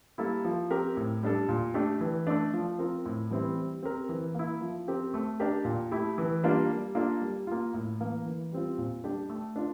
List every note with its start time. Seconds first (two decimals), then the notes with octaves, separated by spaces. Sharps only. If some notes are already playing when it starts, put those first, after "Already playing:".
0.18 G3 A#3 E4 A4
0.45 F3
0.70 C4 G4 A#4
0.97 A2
1.23 G3 D4 A4
1.49 A#2
1.74 A3 D4 G4
2.01 E3
2.27 A3 D4
2.54 F3
2.78 C4 F4 A#4
3.06 A2
3.31 E3 G3 C4 E4
3.56 G3
3.83 C4 G4 A#4
4.09 E3
4.35 A#3 E4
4.61 F3
4.88 C4 G4 A#4
5.14 A3
5.40 D4 G4 A#4
5.65 A#2
5.91 A3 E4 G4
6.18 E3
6.44 G3 A#3 D4 F4
6.70 G3
6.95 A#3 D4 F4 A4
7.21 G3
7.47 A#3 F4
7.74 A2
8.00 E3 A#3
8.26 E3
8.52 G3 C4 F4
8.78 A#2
9.04 G3 D4 G4
9.30 A3
9.56 D4 F4